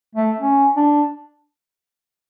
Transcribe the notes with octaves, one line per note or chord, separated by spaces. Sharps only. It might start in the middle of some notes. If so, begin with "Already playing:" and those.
A3
C#4
D4